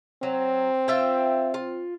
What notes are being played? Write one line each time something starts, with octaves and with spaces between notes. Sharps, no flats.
F#3 C4
F4 E5 G5
F4